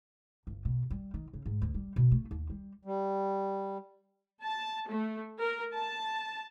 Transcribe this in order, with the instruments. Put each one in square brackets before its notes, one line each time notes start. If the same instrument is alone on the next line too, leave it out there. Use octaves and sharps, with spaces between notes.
[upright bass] G1
B2
G3
D#3
C#3
G#2
D2
G3
B2
A3
D#2
G3
[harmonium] G3
[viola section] A5
A3
A#4
A5